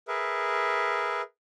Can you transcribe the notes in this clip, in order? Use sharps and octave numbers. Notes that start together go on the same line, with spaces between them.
G#4 A#4 B4 E5